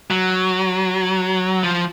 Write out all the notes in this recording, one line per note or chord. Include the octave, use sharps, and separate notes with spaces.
F#3
F3